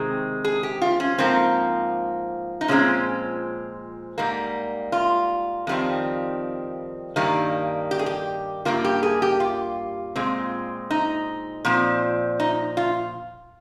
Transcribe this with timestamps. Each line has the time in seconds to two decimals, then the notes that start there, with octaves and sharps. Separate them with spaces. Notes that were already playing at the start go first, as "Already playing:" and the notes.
Already playing: C3 D#3 G#3 C4 G#4
0.44 G#4
0.63 G4
0.82 F4
1.00 C#4
1.18 G#2 F3 A#3 C4
2.61 D#4
2.68 A#2 F3 G#3 C4 C#4
4.18 G#2 G3 A#3
4.92 F4
5.67 F2 D#3 G3 C4
7.16 G2 D#3 G3 A#3
7.91 G4
7.99 G#4
8.06 G4
8.65 G2 G3 A#3 F4
8.84 G4
9.03 G#4
9.22 G4
9.40 F4
10.16 A#2 G#3 C4
10.90 D#4
11.65 A#2 F3 C4
12.40 D#4
12.77 F4